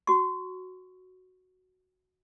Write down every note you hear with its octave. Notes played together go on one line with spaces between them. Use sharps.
F#4 C#6